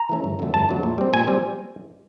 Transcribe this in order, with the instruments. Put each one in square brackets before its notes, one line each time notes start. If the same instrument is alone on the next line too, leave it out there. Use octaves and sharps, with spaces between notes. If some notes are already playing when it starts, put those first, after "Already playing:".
Already playing: [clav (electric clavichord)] A#5
E3 A3 C#4
G1
F2 D3 F#3 A3
G1 A5
F2 D3 F#3 A3
A#2
G3 C4
A#2 G#5
G3 C4